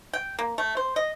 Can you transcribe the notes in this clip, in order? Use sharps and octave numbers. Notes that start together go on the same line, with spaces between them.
G5
A#3
A3
C5
D#5